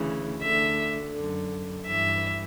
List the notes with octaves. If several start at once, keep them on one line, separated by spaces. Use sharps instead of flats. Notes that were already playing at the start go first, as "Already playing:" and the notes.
Already playing: D2 C#3 E3
D2 D3 E5
F#2 D3
G2 E3 E5